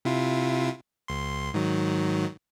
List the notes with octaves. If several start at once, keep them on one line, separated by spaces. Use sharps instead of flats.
C3 E4 F4
C#2 C6
G#2 D#3 F#3